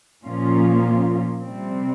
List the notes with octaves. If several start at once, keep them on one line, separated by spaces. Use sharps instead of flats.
A#2 F3 A#3 C#4 F4
C3 G3 C4